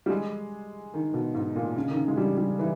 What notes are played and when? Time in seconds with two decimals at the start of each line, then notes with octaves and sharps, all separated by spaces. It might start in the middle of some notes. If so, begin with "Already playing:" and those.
0.06 G3
0.10 G#3
0.94 D#3
1.14 B2
1.34 G#2
1.56 A#2
1.76 C#3
1.90 D#3
1.96 C#3
2.08 G#3
2.17 G3
2.37 G3
2.59 E3